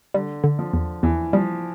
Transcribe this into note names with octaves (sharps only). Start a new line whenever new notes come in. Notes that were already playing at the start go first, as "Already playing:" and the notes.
D3 G3
D3
F3
E2
E2 E3
F3 G3